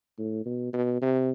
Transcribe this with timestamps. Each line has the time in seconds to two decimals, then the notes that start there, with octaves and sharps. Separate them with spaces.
0.18 A2
0.46 B2
0.73 B2
1.01 C3